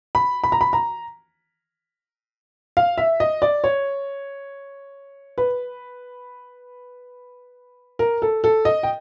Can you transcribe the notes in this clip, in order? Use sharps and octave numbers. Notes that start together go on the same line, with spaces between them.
B5
B5
A#5
B5
A#5
F5
E5
D#5
D5
C#5
B4
A#4
A4
A4
D#5
G5